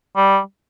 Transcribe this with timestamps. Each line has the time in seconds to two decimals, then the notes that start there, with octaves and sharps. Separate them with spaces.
0.17 G3